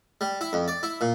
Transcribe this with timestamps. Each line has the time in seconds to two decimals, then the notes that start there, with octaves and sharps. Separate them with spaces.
0.21 G3
0.41 E4
0.53 F2
0.68 D5
0.83 E4
1.01 A#2